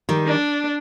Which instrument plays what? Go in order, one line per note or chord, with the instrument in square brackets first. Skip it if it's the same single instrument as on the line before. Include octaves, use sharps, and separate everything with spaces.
[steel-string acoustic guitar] D#3 G3
[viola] D4